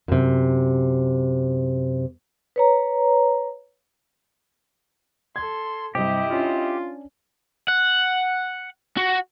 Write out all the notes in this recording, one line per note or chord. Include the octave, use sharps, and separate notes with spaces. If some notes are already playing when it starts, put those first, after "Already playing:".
F#2 C3
B4 C#5 A#5
A4 C6 G#6
G2 C3 E4 G4 D#5
C#4 D4 F4
F#5
F#4